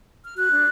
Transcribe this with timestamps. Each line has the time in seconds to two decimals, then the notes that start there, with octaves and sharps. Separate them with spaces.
0.25 F6
0.36 F#4 F#6
0.50 D4